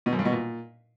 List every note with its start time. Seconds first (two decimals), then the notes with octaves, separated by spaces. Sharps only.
0.06 B2
0.12 F#2
0.19 G2
0.25 B2
0.32 A#2